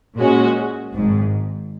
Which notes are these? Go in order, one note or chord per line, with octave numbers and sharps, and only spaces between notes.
A#2 G#3 C#4 F#4
G#1 G#2